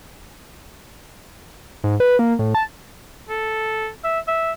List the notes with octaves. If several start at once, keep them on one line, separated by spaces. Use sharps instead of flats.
G#2
B4
A#3
A2
A5
A4
E5
E5